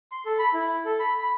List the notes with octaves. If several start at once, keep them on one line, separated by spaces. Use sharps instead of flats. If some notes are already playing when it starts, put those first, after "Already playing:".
C6
A4
B5
E4
A4
B5
B5